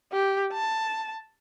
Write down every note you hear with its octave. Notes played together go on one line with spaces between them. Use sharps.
G4
A5